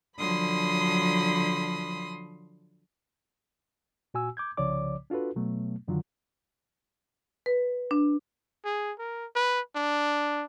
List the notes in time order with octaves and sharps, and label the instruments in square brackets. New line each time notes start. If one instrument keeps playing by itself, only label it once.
[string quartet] D3 F3 F#3 B5 C6 D#6
[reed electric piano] A#2 F#4 G#5 E6
D6 G6 G#6
C2 C#3 F3 C#5 D5 D6
D4 F4 F#4 A4 B4
B2 F#3 A3 B3
F#2 D3 D#3 F#3 F4
[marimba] B4
D4
[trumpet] G#4
A#4
B4
D4